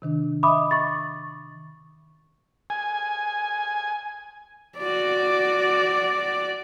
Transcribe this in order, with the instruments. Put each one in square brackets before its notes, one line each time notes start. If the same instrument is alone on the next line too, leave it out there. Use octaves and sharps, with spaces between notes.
[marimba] C3 D#3 D4
[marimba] D#5 E5 [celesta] B5 D6 D#6
[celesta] C#6 A6
[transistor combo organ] G#5
[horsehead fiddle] F#4 D5